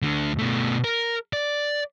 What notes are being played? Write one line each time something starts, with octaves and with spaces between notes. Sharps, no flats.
D2 D3
B2 A3
A#4
D5